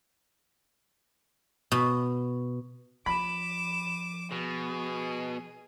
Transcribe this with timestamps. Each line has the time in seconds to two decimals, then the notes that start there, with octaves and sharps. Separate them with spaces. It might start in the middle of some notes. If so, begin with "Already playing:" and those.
1.71 B2
3.06 F3 B5 D6 E7
4.32 B2 G#4